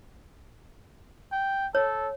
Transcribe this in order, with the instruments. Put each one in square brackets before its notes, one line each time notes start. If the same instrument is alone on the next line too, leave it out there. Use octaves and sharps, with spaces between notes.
[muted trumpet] G5
[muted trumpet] A4 [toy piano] C#5